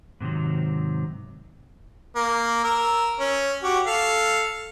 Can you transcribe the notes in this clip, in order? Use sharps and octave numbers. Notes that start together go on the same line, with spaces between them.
G#2 C3 D#3 F#3
A#3
A#4 E6
C#4
F#4 G4
A4 F5